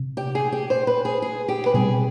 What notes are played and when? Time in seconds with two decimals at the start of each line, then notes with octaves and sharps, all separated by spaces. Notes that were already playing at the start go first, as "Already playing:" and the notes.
Already playing: C3
0.17 G4
0.35 G#4
0.52 G4
0.70 C5
0.87 B4
1.05 G#4
1.22 G#4
1.48 G4
1.66 B4
1.74 B2 G3 C4 G#4